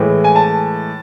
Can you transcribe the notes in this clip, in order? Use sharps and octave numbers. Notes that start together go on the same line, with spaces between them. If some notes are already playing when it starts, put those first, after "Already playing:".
Already playing: A2 E3 G#3
G#5
A5